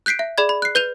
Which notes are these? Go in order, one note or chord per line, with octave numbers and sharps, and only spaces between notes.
F#6 G6 B6 C7 D7
E5
G#4 D5 B5 G#6
B5
F#6 C7
B4 G6 D#7 F7